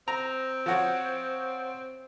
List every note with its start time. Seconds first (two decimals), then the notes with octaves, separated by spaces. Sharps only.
0.08 C4 A#5
0.66 F3 F#4 C#5